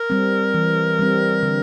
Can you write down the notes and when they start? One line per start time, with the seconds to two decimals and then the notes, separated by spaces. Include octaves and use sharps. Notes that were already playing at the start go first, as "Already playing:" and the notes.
Already playing: A#4
0.10 G3 C4
0.54 E3
0.99 G3 C4
1.43 D3